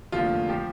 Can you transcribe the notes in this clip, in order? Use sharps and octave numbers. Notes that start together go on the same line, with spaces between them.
F1 D#2 D3 F3 F4
F3 G4